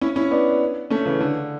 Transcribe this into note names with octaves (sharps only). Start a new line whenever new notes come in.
C#4 E4
C#4 E4
B3 D4
A3 C#4
C#3 E3
D3